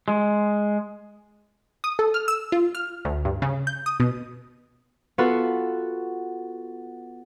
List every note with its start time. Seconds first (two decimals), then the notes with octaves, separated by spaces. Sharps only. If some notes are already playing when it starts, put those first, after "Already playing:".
0.08 G#3
1.84 D#6
1.99 A4
2.14 F6
2.28 E6
2.52 F4
2.75 F6
3.05 D2
3.25 G2
3.42 C#3
3.67 G6
3.86 D#6
4.00 B2
5.18 B3 F4 F#4 A4 B4